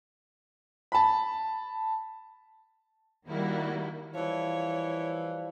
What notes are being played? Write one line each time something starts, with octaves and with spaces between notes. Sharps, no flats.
A5 B5
D#3 G3 A#3 E4 F#4
E3 F3 G3 C#5